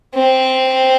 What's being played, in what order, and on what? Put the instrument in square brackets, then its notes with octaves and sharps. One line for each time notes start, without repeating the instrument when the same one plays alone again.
[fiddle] C4